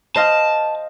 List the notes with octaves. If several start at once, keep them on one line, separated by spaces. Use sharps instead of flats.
C5 D#5 F5 A5